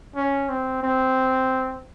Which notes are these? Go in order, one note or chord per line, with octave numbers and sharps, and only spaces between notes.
C#4
C4
C4